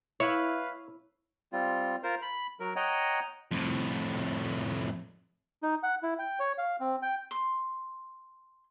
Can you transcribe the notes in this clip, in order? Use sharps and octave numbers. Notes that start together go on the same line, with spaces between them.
E4 B4 C#5 F5
G3 C4 F4
F4 A#4 C5
B5
F#3 A#4
C#5 D#5 F#5 G5 A#5
F2 A2
D#4
F#5
E4
G5
C#5
F5
C4
G5
C6